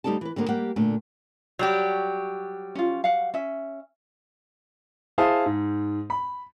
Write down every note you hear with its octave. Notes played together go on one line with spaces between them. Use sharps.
D2 G3 D#4 A4 D5 A5
E3 B4
D3 G3 A#3 B3
G3 A#3 G4 F#5
A#2 D3 A3
F#3 G3 G4
C#4 F4
F5 F#5
C#4 E5
E4 G#4 C5 F5 A5 D#6
G#2
B5